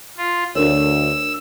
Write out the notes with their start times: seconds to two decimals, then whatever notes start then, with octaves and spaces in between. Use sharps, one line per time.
0.17 F4
0.55 D2 D4 A#4 C#5 E6